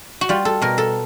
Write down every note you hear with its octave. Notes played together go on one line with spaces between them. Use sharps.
F#4
G3 F4
A4
B2 A#4
A4